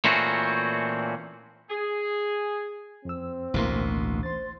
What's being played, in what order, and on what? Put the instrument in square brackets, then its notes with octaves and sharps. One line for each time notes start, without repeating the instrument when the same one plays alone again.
[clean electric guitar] A#2 E3 A3 C4 C#4 F#4
[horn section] G#4
[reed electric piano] F2 E6 [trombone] C4
[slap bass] A1 D2 B2 [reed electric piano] E3 A#3 C6
[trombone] C5 [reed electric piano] C6 A6